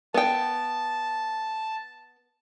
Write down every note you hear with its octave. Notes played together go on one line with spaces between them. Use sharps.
B3 G5 A5